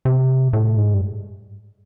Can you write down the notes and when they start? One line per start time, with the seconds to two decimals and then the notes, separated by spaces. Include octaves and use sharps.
0.05 C3
0.53 A2
0.77 G#2
0.94 G2